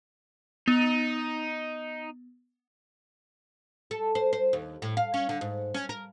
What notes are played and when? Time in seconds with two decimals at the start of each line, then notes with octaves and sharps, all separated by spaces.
0.68 B3 D#4
3.91 A4
4.15 C5
4.33 C5
4.53 D#2
4.82 A2
4.97 F5
5.14 C#4
5.29 D3
5.41 G#2
5.74 C#4
5.89 A#4